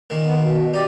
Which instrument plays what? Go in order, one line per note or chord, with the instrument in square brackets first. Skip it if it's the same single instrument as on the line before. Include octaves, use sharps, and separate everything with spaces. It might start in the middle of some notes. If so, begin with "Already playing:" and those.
[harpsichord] A#2 D#3
[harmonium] B3
B2
[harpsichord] D#4 [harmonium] G4 D5